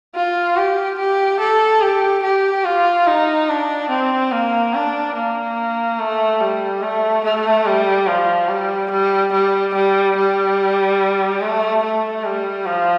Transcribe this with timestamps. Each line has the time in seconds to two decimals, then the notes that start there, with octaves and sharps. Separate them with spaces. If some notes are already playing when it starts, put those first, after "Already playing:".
0.15 F4
0.57 G4
0.98 G4
1.40 A4
1.82 G4
2.23 G4
2.65 F4
3.07 D#4
3.49 D4
3.90 C4
4.32 A#3
4.74 D4
5.15 A#3
5.99 A3
6.41 G3
6.82 A3
7.24 A3
7.66 G3
8.07 F3
8.49 G3
8.91 G3
9.33 G3
9.74 G3
10.17 G3
11.41 A3
11.83 A3
12.25 G3
12.66 F3